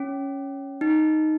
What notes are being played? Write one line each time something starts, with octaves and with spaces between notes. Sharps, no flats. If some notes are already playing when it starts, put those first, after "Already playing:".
Already playing: C#4
D#4